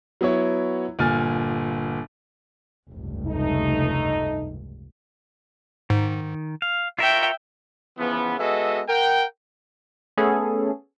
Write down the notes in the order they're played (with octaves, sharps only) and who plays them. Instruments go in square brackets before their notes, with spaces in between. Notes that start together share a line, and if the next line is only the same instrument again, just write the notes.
[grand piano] F#3 B3 E4 C#5
G1 A#2 G#5 F6 A6
[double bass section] F1 C#2 G2
[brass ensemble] A3 D#4
[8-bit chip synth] G#2 [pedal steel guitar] D#3
[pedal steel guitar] F5
[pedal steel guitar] F4 A#4 C#5 [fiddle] E5 G5
[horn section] C#3 E3 F3 B3
G#3 B3 F#4 A4 D#5 E5
A#4 F#5 G5
[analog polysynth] A3 B3 C#4 G#4 A4